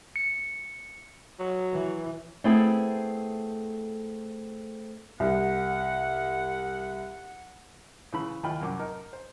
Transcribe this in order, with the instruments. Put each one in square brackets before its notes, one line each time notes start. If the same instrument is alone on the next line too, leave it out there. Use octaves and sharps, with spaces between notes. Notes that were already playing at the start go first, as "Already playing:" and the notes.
[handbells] C#7
[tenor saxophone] F#3
[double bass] E3
[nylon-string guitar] A3 B3 C4 E4 G#4 A4
[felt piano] C2 [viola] F#5
[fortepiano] C#3 E3 B5
D#2 E4 F4 G5 B5
C2 F#2 D6
D#4 A#4
C5